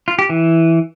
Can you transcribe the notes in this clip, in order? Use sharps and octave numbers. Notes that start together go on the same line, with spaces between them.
F4
G4
E3